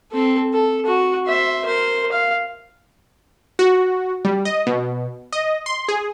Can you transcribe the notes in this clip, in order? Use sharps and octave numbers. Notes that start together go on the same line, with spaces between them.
C4 A4
A4
F#4
C5 E5
A#4 C5
F5
F#4
G3
D#5
B2
D#5
C6
G#4